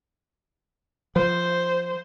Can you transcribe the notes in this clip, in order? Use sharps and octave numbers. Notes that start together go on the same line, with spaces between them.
F3 C5